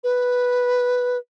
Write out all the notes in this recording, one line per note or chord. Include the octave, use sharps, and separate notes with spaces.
B4